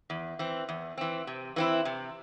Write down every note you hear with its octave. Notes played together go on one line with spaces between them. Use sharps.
E2
E3 C4
E2
E3 C4
C3
E3 C4 E4
C3